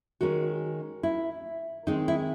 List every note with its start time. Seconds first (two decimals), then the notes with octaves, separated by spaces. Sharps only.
0.21 D#3 G#3 C#4 F#4
1.03 E4
1.87 D#3 G#3 C4 D#4
2.08 E4